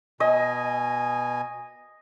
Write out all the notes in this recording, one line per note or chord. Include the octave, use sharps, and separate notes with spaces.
B2 D#5 G#5